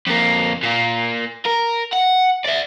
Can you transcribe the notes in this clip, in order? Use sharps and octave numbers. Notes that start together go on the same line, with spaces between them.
F2 A#3
A#2 A#3
A#4
F#5
D5 E5